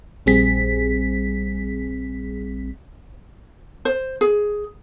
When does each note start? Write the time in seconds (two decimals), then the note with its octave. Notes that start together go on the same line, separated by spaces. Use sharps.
0.26 A#1 G3 C4 G#4 B6
3.85 C5
4.21 G#4